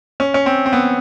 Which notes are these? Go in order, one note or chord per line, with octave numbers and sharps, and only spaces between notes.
C#4
C#4
C4
C4
B3